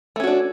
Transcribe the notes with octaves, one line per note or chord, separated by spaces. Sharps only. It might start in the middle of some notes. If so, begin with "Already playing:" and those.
A3 C#4 D4 F#4